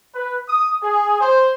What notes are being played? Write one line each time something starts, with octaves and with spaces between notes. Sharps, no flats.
B4
D#6
G#4
C5